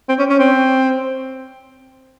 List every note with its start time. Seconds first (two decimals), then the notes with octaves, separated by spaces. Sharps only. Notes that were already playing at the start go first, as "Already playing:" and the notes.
0.09 C4
0.19 C#4
0.30 C#4
0.39 C4